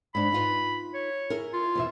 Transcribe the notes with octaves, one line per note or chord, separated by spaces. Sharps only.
G#2 D4 B5
D#4 F4 B4
C#5
E4 G#4 A#4
F4
E2 B2 E5